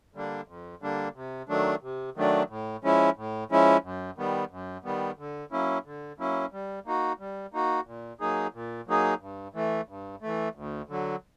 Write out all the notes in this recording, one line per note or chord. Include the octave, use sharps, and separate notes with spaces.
D3 G3 A#3 D4
F2
D3 G3 A#3 D4
C3
D#3 F#3 A3 D4
C3
D#3 F#3 A3 D4
A2
F3 G#3 C#4 E4
A2
F3 G#3 C#4 E4
F#2
D#3 G3 B3
F#2
D#3 G3 B3
D3
F#3 A#3 C#4 E4
D3
F#3 A#3 C#4 E4
G3
A#3 D#4 F#4
G3
A#3 D#4 F#4
A#2
F#3 A#3 D#4 G#4
A#2
F#3 A#3 D#4 G#4
G2
E3 A3
G2
E3 A3
D2
D3 F#3